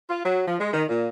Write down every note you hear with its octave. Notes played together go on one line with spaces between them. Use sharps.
F4
F#3
F3
G#3
D#3
A#2